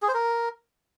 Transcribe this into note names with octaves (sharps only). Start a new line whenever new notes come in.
G#4
C5
A#4